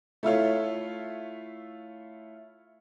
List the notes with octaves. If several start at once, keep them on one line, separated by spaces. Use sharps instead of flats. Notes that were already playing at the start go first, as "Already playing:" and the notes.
A3 E4 F4 C#5